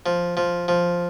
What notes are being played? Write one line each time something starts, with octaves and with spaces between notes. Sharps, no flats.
F3
F3
F3